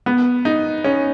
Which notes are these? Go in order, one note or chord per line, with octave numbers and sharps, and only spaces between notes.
B3
D#4
C#4